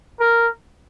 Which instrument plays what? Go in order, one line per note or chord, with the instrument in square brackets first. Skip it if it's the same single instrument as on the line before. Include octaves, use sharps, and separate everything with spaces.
[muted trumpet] A#4